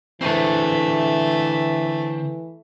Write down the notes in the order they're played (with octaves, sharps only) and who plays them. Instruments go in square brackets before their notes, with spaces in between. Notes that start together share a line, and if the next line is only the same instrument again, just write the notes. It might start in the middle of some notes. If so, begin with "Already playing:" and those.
[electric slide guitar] D3 C4 [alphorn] E3 [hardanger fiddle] A3